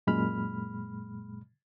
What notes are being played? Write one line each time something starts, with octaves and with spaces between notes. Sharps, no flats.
F#2 A#2 G#3 B5 F6